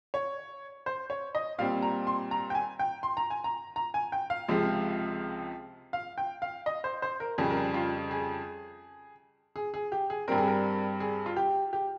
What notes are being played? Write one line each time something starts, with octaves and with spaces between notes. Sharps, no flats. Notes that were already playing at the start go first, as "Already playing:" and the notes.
C#5
C5
C#5
D#5
A#2 G3 C4 F5
A#5
C6
A#5
G5
G#5
G5
C6
A#5
G#5
A#5
A#5
G#5
G5
F5
C#2 C3 F3 G#3
F5
G5
F5
D#5
C5
C5
A#4
F2 C#3 G3 G#4
A#4
G#4
F4
G#4
G#4
G#4
G4
G#4
G2 G3 C4 A#4
G#4
A#4
G#4
F4
G4
G4